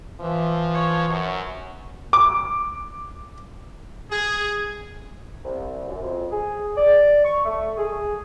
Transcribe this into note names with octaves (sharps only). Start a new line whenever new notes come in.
E3 F3 E5
C#5
F#2
D6
G#4
C2
F#2
F2
G#4
D5
C#6
A3
G#4